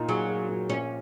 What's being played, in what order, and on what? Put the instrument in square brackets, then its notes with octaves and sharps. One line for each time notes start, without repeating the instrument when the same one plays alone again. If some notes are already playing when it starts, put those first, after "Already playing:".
Already playing: [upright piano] A#2 A#3 D#4
[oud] F#3 [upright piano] G#4
[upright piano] G#4
A#2
[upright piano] A#1 [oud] C#4